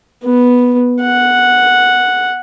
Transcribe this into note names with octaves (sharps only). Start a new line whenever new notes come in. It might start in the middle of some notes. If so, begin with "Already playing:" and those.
B3
F#5